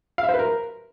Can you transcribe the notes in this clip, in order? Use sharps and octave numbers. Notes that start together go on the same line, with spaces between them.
F5
E5
C5
B4
A#4